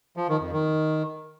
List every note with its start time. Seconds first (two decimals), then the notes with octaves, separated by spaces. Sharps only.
0.17 F3
0.29 D#3
0.40 F2
0.52 D#3